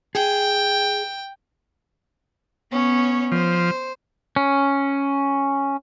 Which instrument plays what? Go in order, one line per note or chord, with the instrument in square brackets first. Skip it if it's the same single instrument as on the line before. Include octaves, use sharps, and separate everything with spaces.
[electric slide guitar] G#4 [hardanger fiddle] G5
[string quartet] B3 C#4 C#5
[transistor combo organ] F3 [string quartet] C5
[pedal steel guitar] C#4